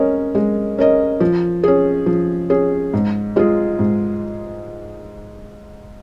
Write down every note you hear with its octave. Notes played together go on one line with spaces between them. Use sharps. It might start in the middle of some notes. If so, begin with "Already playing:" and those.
Already playing: G#3 C#4 A#4 D#5
G#3
C#4 A#4 D#5
F3
C#4 G#4
F3
C#4 G#4
G#2
G#3 F4 G#4
G#2